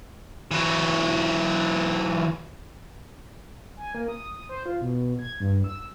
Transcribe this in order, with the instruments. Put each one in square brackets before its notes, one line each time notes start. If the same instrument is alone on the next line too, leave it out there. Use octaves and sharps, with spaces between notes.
[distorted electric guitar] E3 F#3
[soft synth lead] G#5
A#3
D#6
D#6
C5
F4
B2
G#6
G2
E6